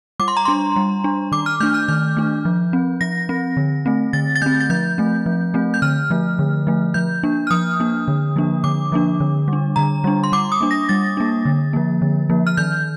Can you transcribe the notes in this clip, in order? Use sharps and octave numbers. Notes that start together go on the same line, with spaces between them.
G3 D6
C6
A#5
D4 C6
G3
D4
D#3 D6
F6
A3 D4 G6
F6
D#3 G6
A3 D4
F3
C4
F3 A#6
C4
D3
A3 C4
D3 A6
A6
A3 C4 G6
A6
F3 G6
A3 C4
F3
A3 C4
G6
D3 F6
F3 A3
D3
F3 A3
F3 G6
A#3 D4
F6
F3 D#6
A#3 D4
D3
F3 A#3 D4
D3 D6
F3 A#3 D4
D3
G3 D4
D3 A#5
G3 D4
C6
G3 D6
D#6
A#3 D4
A#6
G3 A6
A#3 D4
D3
F3 A#3
D3
F3 A#3
F6
D#3 G6